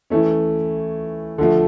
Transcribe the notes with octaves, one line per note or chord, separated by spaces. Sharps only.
E3 A3 C#4
D3 F3 A3